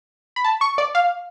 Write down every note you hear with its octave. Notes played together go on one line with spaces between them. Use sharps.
B5
A5
C#6
D5
F5